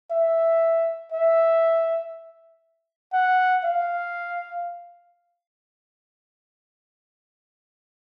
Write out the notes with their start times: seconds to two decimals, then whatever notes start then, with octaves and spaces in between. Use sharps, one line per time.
0.11 E5
1.12 E5
3.13 F#5
3.64 F5